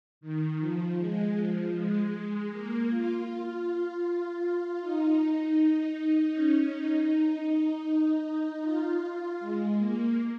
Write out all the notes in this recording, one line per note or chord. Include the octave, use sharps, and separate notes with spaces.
D#3
F3
G#3
F3
G#3
A#3
F4
D#4
C#4
D#4
F4
G#3
A#3